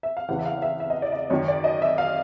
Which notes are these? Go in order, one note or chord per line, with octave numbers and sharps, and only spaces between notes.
E5
F5
E2 C#3 E3 F#5
E5
F5
E5
E5
D#5
D5
D#5
F#2 D#3 C#5
D5
D#5
E5
F5